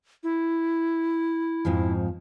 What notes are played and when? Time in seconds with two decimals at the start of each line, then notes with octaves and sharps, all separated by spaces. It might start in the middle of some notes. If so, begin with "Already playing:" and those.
0.23 E4
1.65 F2 G#2 F3